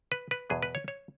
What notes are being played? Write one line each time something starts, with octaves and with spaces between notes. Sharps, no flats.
B4
B4
E2 B2 F#3 B3 G#4
B4
C#5
C#5